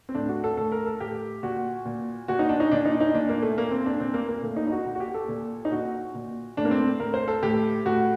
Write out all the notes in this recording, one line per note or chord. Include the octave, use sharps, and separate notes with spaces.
C4
A2 D4
F#4
A4
A2 A4
A#4
A4
A2 G4
A#2 F#4
A#2
A#2 F#4
D#4
D4
D#4
A#2 D4
D#4
D#4
A#2 D4
A#3
A3
A#2 A#3
C4
D4
A#2 C4
A#3
A#3
A#2 A3
D#4
D#4
F#4
A#2
F#4
G4
A4
A#2
D#4
A#2 F#4
A#2
A2 D4
A#3
C4
A2 A#4
C5
A4
A2 G4
A2 F#4